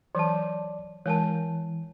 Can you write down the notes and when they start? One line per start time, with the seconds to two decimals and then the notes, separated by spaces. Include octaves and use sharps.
0.15 E3 F#3 C#5 D5 A5
1.06 E3 G#3 A#4 C#5 G#5 A5